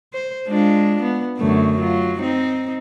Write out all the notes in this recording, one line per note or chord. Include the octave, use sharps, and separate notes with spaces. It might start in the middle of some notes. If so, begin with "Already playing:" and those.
C5
G#3 D4 F4
B3
F#2 D3 A3
F#3 F4
C4 D#4